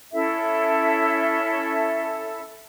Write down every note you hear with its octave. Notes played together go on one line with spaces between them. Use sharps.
C#4 E4 A4 E5